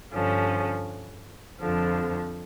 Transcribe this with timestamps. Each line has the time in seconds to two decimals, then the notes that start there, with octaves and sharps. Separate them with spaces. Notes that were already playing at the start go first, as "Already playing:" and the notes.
0.11 G2 D3 F3 C#4
1.60 F2 D3 F3